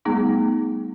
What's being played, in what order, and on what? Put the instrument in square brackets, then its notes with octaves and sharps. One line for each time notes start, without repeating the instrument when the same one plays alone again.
[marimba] G3 A3 B3 D#4 G#4